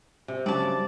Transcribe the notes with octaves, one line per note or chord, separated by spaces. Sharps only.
C3
G2 C#3 F#3 D5 A5